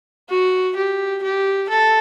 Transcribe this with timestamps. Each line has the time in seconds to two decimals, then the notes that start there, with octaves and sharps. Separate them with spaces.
0.29 F#4
0.76 G4
1.23 G4
1.70 A4